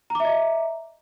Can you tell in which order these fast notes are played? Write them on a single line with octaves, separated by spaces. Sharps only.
A#5 D6 E5 D#5